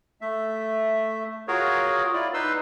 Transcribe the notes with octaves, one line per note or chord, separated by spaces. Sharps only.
A3 E5
F4 F#4 G#4 A#4 C#5
E4 F4 D5
D#4 B4 C6 E6